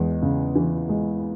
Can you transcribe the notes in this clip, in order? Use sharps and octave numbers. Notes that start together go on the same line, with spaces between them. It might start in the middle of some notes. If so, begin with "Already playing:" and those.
Already playing: E2 G#3
C#3
E3
G#3